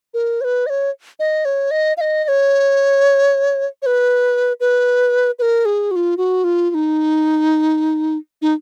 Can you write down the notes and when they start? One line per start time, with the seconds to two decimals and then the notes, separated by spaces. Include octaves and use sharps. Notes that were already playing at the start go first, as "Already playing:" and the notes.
0.14 A#4
0.41 C#5
0.44 B4
0.66 D#5
0.70 C#5
1.19 D#5
1.45 C#5
1.71 D#5
1.97 F5
2.01 D#5
2.24 D#5
2.28 C#5
3.82 C#5
3.86 B4
4.60 B4
5.39 B4
5.42 A#4
5.65 G#4
5.91 F#4
5.96 F4
6.17 F#4
6.44 F4
6.70 F4
6.74 D#4
8.42 D#4